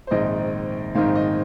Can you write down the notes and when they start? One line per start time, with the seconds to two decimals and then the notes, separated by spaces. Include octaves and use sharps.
0.07 C5
0.11 A#1 G#2 D#3 C4 D#4 D#5
0.95 A#1 G#2 D#3 C4 D#4 F5
1.15 D#5